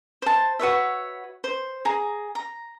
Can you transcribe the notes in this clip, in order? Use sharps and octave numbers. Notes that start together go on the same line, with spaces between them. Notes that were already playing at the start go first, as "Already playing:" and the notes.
C5 A5
F#4 B4 C#5 E5
C5
G#4 A#5
A#5